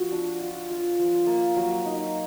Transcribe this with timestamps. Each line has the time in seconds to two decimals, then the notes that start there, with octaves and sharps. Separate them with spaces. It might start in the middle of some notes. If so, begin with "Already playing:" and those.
Already playing: F3 F#4
0.12 D4
0.40 F4
0.70 F4
0.99 F3
1.27 A#3
1.57 F#3
1.86 D#4